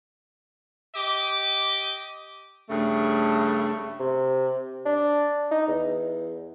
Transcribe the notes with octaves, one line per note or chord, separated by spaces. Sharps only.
G4 D#5 D6
G2 C#3 A3
C3
D4
D#4
E2